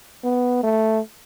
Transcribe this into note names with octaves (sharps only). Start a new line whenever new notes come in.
B3
A3